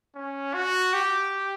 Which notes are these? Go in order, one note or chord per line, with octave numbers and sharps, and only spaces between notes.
C#4
F#4
G4